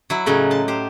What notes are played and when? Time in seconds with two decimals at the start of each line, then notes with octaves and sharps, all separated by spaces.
0.10 F#3 E4
0.26 A2 C#3 F#3 D#4
0.51 A5 C6
0.68 G4 C5